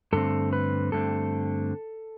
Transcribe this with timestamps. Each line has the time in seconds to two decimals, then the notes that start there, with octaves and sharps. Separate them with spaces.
0.13 G2 D3 A3 C4 A4
0.53 B4
0.92 G2 D3 A3 C4 A4